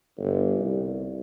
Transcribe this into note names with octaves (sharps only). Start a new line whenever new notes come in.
G1
C2